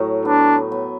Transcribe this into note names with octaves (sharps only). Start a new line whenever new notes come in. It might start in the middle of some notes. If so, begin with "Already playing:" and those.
Already playing: A2 F#3
B3 D4
B3